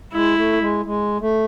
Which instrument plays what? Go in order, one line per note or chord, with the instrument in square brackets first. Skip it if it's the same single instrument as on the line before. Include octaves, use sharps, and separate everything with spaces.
[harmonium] G#3 [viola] E4
[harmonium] A3
G#3
G#3
A3